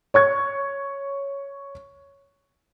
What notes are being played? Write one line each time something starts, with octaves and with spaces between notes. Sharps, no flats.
C#5 C#6 G#6